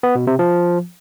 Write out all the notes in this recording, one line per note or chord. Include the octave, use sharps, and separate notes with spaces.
B3
B2
C3
F3